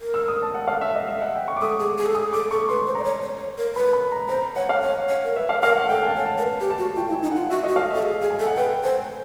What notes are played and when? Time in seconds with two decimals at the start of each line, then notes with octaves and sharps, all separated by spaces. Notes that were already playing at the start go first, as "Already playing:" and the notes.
0.01 A#4
0.14 E6
0.28 D#6
0.42 A5
0.54 F#5
0.67 F5
0.81 E5
0.95 D#5
1.08 E5
1.22 F#5
1.35 G5
1.48 C#6
1.57 D6
1.61 A4 D#6
1.80 G#4
1.98 G#4
2.06 A4
2.15 G#4 D#6
2.33 A4 D6
2.51 A4 C#6
2.69 B4 C6
2.86 C5
2.95 D5 A#5
3.04 C#5
3.22 C#5
3.40 C#5
3.58 A#4
3.75 B4 B5
3.93 B5
4.12 A#5
4.28 C5 A#5
4.56 C#5 F#5
4.69 F5
4.82 C#5
5.09 C#5
5.24 A#4
5.36 B4 E5
5.49 F5
5.63 A#4 F5
5.76 F#5
5.89 A4 G5
6.03 G#5
6.07 A5
6.16 C#5
6.25 A5
6.38 A#4
6.43 B4
6.60 G4
6.70 A5
6.78 F#4
6.96 F4 G5
7.09 E4
7.14 G#5
7.22 D#4
7.32 F4 F#5
7.50 F#4 E5
7.63 D#5
7.68 F#4
7.76 F5
7.90 E5
7.95 A4
8.03 G#4
8.21 G#4
8.30 G#5
8.39 A4
8.46 F#5
8.56 B4 G5
8.83 C5 G#5